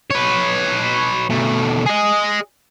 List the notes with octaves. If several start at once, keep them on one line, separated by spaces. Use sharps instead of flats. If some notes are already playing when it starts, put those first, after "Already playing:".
B4 C#5
B2 A3
G#4 D#5